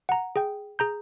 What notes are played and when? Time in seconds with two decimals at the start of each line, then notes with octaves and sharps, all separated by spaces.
0.09 F#5 A#5
0.36 G#4 G5
0.79 G#4 A#5 G6